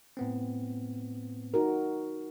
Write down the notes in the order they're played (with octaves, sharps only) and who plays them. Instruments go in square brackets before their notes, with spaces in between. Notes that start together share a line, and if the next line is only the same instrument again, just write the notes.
[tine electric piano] A2 B3 C4
[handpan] D#4 F#4 A#4